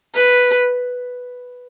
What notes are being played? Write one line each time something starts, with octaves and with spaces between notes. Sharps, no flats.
B4